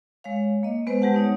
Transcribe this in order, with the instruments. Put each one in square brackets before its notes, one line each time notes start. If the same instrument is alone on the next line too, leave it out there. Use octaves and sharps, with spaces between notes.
[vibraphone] G#3 C#5 F5
A#3 D#5
G#3 B3 B4 C5
G3 G#3 G4 B4 F#5 A5
B3 D#4 C#5